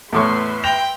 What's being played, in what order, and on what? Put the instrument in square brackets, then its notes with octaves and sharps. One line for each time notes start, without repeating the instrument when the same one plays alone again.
[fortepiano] E2 A2 C#6 [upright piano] A3 [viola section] B4 E5 C6
[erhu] G5 [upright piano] A#6 F7